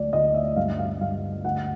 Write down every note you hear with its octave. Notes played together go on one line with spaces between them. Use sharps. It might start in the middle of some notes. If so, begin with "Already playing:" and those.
Already playing: D2 D5
D2 D#5
E5
G2 F5
F5
G2 F5
D2 F#5